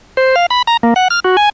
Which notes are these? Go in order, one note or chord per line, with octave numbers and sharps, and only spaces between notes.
C5
F5
B5
A#5
A#3
F#5
F6
F#4
G#5